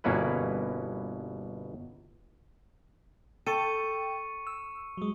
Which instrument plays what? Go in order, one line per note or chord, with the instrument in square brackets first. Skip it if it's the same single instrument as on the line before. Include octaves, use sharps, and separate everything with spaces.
[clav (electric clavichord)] G1 B2 A#3 C#4 E4 B4
[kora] A4 [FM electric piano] G5 A6 [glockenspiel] C#6 C#7 D#7
[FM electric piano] E6
F#3 G#3